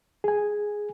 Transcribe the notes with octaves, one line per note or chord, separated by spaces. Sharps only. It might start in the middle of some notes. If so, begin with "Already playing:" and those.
G#4 G#5